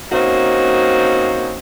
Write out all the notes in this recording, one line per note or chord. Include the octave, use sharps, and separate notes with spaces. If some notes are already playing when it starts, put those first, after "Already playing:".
A#3 C4 C#4 D#4 F#4